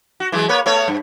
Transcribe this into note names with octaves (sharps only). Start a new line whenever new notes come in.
F#4
E3 F#3 G#3
A#3 B4 C#5
A3 B3 C#5
G2